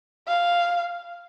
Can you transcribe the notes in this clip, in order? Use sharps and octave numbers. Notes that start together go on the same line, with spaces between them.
F5